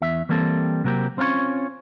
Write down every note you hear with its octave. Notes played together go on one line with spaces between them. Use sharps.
E2 E5
E3 G3 A#3 C4 A4
C3 F#3 A#3 C4 G4
C4 C#4 F4 A#4 C#5